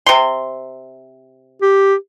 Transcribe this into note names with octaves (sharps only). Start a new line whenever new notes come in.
C3 C6
G4